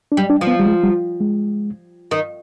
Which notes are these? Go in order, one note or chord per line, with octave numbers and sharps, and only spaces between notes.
D4
G3
D4
F3
B3
G3
G#3
G3
G#3
D#3